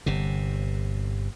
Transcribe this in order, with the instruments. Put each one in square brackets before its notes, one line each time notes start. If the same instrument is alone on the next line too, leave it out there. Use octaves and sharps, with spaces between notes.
[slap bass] G1 C3